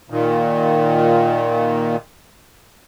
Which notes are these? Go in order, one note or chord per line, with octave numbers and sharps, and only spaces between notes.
A#2 D#3